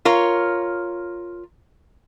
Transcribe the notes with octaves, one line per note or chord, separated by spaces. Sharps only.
F4 A#4 C#5